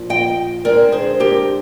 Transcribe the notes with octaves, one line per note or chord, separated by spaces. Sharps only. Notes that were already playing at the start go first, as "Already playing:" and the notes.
Already playing: A#2 F3
D#5 G5
D3 G#3 C4 A#4 D5
G#4 C5
G4 A#4